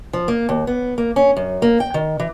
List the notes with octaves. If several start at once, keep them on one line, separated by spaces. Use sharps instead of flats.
F3
A#3
D#2
B3
A#3
C#4
F#2
A#3
G5
D#3
E3